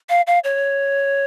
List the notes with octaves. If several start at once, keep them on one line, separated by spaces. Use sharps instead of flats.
F5
F5
C#5